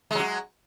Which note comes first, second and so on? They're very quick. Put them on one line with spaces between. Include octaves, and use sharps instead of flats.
G#3 F#3 F#4